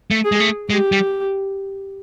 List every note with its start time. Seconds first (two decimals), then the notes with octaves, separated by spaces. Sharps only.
0.11 A3
0.25 G#4
0.32 G#3
0.40 A3
0.70 G#3 G4
0.92 G3